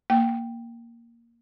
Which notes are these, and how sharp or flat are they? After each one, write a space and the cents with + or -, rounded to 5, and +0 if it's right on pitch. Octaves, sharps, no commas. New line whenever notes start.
A#3 +0 G5 +0